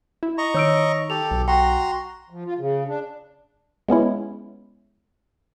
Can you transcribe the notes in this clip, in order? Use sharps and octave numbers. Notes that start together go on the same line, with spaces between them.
E4
D#5 A#5 C#6
D#3 C#5 E6 D7
G4 A4 F7
B1
F#4 G5 A#5 C6
F3
F4
C#3
D4
G#3 B3 C#4 E4